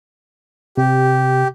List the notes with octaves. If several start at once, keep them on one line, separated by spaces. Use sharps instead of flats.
C3 G4